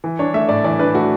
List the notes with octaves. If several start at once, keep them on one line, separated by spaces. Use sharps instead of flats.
E3
D4 C#5
A3 E5
A2 D5
E3 D5
D4 B4
A3 F#4